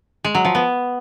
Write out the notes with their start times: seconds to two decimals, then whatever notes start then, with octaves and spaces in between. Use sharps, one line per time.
0.25 G#3
0.35 F#3
0.45 F3
0.55 B3